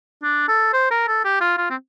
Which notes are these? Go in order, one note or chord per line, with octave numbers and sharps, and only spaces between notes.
D4
A4
C5
A#4
A4
G4
F4
F4
C4